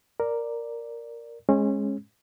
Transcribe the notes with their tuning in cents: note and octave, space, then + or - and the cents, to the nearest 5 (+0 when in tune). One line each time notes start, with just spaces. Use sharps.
A#4 +0 D5 +0
G#3 +0 C#4 -25